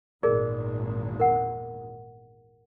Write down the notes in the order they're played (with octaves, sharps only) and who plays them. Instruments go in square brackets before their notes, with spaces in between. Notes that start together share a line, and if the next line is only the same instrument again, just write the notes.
[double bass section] G#1 E2 A#2 [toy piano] G#4 A#4 D5
[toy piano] A#4 F#5